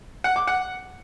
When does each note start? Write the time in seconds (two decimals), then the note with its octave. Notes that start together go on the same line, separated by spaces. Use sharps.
0.24 F#5
0.36 D6
0.47 F#5